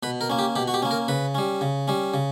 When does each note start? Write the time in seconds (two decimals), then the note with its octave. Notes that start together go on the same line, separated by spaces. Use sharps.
0.03 B2 B4
0.21 A#4
0.29 A#3 C#4
0.39 G4
0.56 B2 G4
0.68 F#4
0.74 G4
0.82 A#3 C#4
0.91 A#4
1.08 C#3 B4
1.35 G3 C#4
1.61 C#3
1.88 G3 C#4
2.14 C#3